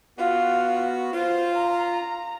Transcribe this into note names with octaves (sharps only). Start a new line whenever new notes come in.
B3 F4 F#4
F4 C5
A#5